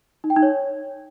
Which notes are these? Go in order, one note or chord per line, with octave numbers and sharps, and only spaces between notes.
D#4
G5
D#4
C#5